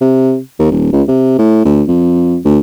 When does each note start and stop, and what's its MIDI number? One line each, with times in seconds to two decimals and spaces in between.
0.01 0.39 48
0.59 0.70 39
0.72 0.88 27
0.93 1.03 37
1.08 1.35 48
1.39 1.64 45
1.65 1.83 38
1.88 2.37 41
2.45 2.59 38